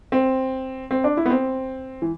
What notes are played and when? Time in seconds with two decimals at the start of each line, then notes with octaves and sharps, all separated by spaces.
0.12 C4
0.91 C4
1.04 D4
1.17 E4
1.26 B3
1.30 C4
2.02 E3